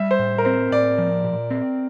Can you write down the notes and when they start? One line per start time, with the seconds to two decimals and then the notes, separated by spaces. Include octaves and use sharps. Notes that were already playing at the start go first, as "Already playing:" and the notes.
Already playing: G3 E5
0.11 C5
0.19 A2
0.38 A#4
0.45 C4 C5
0.72 A2 D5
0.98 F3
1.24 A#2
1.50 C4